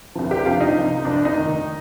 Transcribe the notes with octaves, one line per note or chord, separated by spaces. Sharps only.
C2 C3 F3
G4
C2 C3 F3 F4
D#4
C2 C3 F3
C2 C3 F3 D4
D#4
F1 D#2 D#3